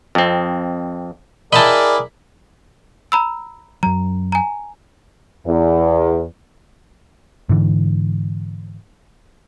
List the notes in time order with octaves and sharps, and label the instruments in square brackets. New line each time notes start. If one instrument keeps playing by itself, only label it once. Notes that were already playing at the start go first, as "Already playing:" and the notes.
[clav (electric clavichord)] F2 C4
[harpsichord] E4 G5 B5 [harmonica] G#4 A#4 D5 [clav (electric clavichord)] D#5 A5
[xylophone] A#5 B5 E6
[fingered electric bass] F#2 F#3 [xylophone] A#5
[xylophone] G#5 A#5
[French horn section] E2
[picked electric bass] G#2 D3 E3